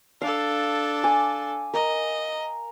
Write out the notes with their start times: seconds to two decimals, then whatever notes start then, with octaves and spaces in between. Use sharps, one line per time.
0.22 D4 A4 F5
1.04 G#5 D6
1.74 A#4 D#5